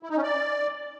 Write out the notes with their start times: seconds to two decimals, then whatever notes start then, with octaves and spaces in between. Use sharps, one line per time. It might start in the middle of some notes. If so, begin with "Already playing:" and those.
0.03 E4
0.10 D#4
0.16 C#4
0.23 D5